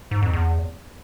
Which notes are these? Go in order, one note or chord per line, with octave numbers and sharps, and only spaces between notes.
G#2
F2
E2